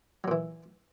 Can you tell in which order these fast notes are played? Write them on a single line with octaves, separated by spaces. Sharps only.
F#3 A#2 E3